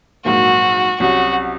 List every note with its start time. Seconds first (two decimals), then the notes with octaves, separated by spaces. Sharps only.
0.25 A#1 G#2 F#3 A#3 F#4
1.00 C2 C3 F#3 C#4 F#4